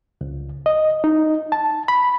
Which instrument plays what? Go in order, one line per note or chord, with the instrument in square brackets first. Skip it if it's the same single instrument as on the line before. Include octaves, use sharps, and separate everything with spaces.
[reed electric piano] C#2
D#5
D#4
A5
B5